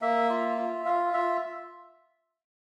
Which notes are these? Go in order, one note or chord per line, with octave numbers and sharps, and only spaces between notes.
A#3 E5
F4
F4
F4 F5
F4 E5